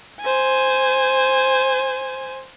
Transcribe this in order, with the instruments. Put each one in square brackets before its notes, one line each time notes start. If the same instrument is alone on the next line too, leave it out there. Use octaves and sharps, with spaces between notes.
[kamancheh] C5 G#5